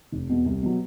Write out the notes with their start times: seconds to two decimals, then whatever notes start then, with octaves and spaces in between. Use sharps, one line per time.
0.12 F1
0.30 E2 B2
0.46 C2
0.63 B2 F#3